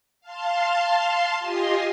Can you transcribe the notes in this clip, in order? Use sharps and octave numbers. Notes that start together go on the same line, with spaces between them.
F5 A5 C6
F4 G4 D#5 G#5 C6